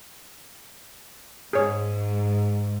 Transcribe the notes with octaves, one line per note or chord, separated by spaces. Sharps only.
G#2 G#4 C#5